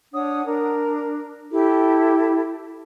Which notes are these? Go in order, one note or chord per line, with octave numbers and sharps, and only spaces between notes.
D4 C#5 F#5 D#6
D4 A#4
E4 G4 A4